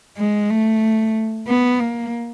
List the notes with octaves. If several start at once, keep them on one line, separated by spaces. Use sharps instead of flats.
G#3
A3
B3
A#3